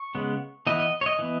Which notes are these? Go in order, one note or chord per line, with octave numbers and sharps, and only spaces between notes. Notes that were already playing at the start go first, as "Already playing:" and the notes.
Already playing: C#6
C#3 G#3 B3
E3 B3 D#5
D#5
C#5
D#5
E3 B3